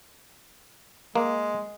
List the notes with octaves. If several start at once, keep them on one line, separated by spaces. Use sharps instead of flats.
G#3 A#3